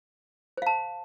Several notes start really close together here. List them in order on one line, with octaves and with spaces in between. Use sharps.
C5 F5 A5